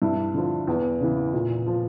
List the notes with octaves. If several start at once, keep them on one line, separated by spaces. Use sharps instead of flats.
G2 E4
D3 F3
E2
C#3 E3
A#2
F3